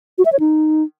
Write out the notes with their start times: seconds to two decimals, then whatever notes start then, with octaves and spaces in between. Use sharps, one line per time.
0.18 F#4
0.25 E5
0.33 C#5
0.40 D#4